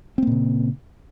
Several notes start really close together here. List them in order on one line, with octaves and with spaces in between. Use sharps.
C4 A#3 A#2 C#3